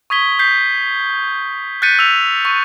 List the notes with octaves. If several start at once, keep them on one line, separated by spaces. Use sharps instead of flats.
C#6 D#6 G#6 B6 G7
G6 B6 C7
F#6 G6 A6 B6 C#7 D#7
E6 F7
C#6